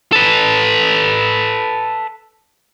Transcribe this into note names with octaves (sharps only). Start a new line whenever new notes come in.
A4 B4